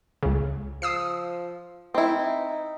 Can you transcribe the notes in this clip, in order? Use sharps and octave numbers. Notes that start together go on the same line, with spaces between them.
C#2 C#3
F3 D#6 E6 C7
C4 D#4 E4